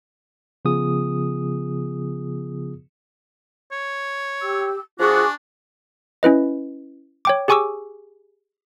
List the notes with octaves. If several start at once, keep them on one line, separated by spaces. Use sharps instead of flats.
C#3 F3 B3 F4 G#4 D#6
C#5
G4 E6
F3 D4 F4 F#4 G#4 G#5 C#6 D6
C#4 E4 B4 D#5
C#5 G5 D6
G4 G#4 G#5 C#6 D6 E6